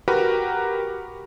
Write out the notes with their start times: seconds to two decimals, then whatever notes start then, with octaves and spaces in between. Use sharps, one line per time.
0.08 F#4 G4 A#4 B4 A#5